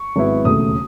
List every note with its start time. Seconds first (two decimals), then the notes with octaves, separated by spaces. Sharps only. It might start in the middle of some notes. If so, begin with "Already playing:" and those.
Already playing: C#6
0.16 G#1 G#2 F#3 B3 E4
0.45 E1 D#2 C#3 F#3 A3 D#6